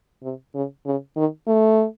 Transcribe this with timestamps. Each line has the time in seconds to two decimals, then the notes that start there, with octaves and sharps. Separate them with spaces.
0.23 C3
0.55 C#3
0.86 C#3
1.17 D#3
1.47 A3